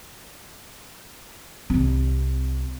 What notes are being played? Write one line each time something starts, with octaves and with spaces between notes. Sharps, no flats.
C2 C4